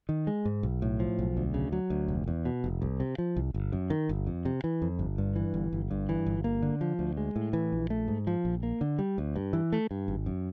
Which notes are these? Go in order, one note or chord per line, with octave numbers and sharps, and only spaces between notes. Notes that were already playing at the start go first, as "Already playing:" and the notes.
D#3
G#3
G#2
B1
A2
F3
B1
D2
C#3
F#3
D2
F1
E2
B2
F1
C2
C3
F3
C2
G1
F#2
D#3
G1
F2
C3
E3
F2
G1
G2
E3
G1
G1
G2
E3
G1
A#3
D3
F3
D2
G#3
A2
E3
A#1
A3
G#2
F3
A#1
A#3
D3
G3
D2
G2
E3
A3
G2
G#1
F#2